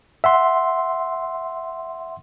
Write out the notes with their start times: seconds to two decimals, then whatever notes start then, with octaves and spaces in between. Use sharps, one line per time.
0.24 E5 F#5 C6